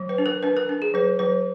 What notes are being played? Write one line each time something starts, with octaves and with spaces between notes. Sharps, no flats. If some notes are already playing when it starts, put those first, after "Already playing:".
Already playing: F#3
B4
D4
A#4
D4 B4
A#4
D4
G#4
F#3 B4
F#3 B4